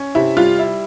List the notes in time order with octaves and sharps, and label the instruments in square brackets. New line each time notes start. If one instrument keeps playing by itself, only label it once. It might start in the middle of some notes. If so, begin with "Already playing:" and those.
Already playing: [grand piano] C#4
[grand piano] C3 [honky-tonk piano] E4
[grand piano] G3 [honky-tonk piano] F4
[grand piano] E4